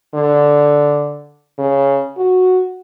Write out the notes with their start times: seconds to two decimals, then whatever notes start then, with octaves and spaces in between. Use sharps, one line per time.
0.15 D3
1.59 C#3
2.17 F#4